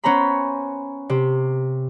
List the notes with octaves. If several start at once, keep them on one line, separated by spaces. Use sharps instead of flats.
B3 C#4 C5 A#5 B5
C3